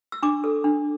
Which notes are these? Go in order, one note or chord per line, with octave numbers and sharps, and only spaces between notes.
E6
D4 D6
A4
D4